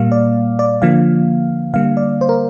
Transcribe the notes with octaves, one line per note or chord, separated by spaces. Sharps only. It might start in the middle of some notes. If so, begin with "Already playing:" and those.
Already playing: A#2 G3 A#3 F5
D5
D5
D3 F3 A#3 F5
D3 G3 A#3 F5
D5
C5
A#4